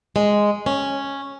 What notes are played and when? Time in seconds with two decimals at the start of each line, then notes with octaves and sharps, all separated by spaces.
0.16 G#3
0.66 C#4